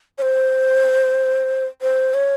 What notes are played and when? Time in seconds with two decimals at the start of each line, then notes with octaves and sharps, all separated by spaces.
0.18 C#5
0.22 C5
1.82 C5
2.14 C#5